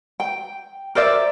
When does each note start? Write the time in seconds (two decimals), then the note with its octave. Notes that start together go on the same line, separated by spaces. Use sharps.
0.20 G5
0.95 A#4 C5 D5 E5